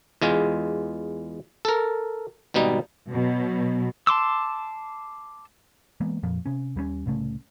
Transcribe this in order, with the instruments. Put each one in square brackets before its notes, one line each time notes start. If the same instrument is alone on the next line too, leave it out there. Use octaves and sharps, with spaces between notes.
[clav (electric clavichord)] E2 G#3 F4 G#5
A4 A#4
G#1 B2 G3 D#4
[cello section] B2 F#3
[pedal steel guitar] A5 C6 D6 E6
[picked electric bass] E3 G#3 A#3 B3
F2 A#2 F3
C3 C#4
D#2 G3 G#3 C#4
C2 A2 C#3 A3